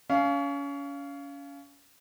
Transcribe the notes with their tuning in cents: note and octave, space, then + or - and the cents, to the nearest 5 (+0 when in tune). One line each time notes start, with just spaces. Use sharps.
C#4 +30 F5 -10